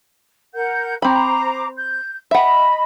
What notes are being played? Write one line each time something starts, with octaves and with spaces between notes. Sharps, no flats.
A#4 F#5 G6
C4 C5 A#5 B5 D6
G6
D#5 E5 F#5 B5